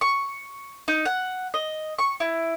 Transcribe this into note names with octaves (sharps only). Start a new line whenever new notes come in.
C#6
D#4
F#5
D#5
C#6
E4